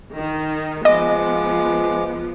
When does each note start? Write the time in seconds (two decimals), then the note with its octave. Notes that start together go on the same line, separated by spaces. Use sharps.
0.14 D#3
0.85 F3 G#3 B3 D#5 D6